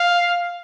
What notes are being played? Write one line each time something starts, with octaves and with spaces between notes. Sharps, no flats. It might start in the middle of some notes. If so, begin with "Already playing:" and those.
Already playing: F5